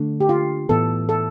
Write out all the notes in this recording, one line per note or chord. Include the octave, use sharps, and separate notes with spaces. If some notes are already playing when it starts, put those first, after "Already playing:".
Already playing: D3 A3 D4
G4
F4
A2 E3 B3 A4
A4